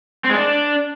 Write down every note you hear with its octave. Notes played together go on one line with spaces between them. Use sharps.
C4
G#3
D4